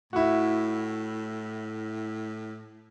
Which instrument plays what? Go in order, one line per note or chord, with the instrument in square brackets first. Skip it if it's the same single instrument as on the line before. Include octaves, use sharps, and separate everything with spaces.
[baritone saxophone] A2 [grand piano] E4 F#4